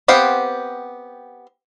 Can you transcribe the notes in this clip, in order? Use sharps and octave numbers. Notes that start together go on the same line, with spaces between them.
B3 C4 G4 F5 F#5